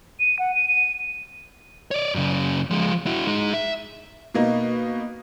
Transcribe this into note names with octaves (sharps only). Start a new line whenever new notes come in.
D#7
F#5
D#7
D#7
C#5 D5
F#2 C#3
F3 G#3
E4 F#4
G#3 D#4
E5
B2 A#3 D#4